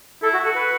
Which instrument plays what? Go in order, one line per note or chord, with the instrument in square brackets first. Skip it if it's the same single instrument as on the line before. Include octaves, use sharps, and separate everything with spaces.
[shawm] E4 [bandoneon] A4
[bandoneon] F#4
[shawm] F#4 [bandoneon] A4
[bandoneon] B4